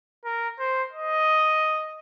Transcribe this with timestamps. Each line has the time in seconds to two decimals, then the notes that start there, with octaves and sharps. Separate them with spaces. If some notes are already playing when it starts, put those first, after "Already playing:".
0.25 A#4
0.59 C5
0.93 D#5